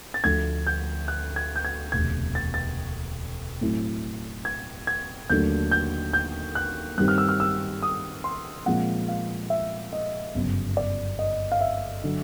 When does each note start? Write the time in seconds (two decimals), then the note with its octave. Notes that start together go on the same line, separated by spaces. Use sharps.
0.14 A6
0.24 D2 D3 F3 A3 G#6
0.67 G6
1.08 F#6
1.36 G#6
1.56 G6
1.65 G#6
1.92 E1 D2 C3 G#6
2.35 A6
2.54 A6
3.61 A2 F#3 A3 C4 E4
4.45 G#6
4.87 G#6
5.30 D#2 D3 F#3 A3 D4 G6
5.71 G6
6.13 G6
6.55 F#6
6.98 G2 D#3 G3 C4 F#6
7.08 F6
7.18 E6
7.29 F6
7.40 E6
7.82 D#6
8.24 C6
8.66 A#2 F3 G#3 C4 F#5
9.08 F5
9.50 E5
9.93 D#5
10.35 G1 F#2 C#3 F#3 B3
10.77 D5
11.19 D#5
11.52 F5
11.61 E5
12.04 D3 F#3